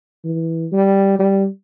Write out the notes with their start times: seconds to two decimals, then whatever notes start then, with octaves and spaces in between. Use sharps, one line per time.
0.25 E3
0.72 G3
1.20 G3